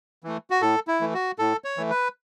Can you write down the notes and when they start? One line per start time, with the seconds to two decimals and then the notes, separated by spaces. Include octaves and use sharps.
0.24 E3 A3
0.50 F#4
0.62 A2 A4
0.87 E4
1.00 E3 A3
1.14 F#4
1.39 A2 A4
1.64 C#5
1.77 E3 A3
1.90 B4